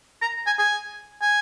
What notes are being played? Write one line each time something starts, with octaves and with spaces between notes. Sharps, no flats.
A#5
G#5
G#5
G#5